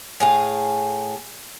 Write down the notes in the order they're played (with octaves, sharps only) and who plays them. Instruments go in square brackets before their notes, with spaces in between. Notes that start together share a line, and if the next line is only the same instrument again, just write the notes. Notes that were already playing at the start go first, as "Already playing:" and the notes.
[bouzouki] A2 G#4 F5